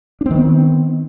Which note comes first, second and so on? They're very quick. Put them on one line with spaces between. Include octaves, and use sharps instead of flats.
D4 C4 D#3 B3